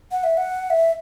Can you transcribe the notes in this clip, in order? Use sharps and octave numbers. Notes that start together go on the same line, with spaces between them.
F#5
E5
F#5
E5